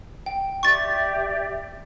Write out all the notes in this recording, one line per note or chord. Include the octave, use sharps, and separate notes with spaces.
G5
G4 D5 E5 C#6 A6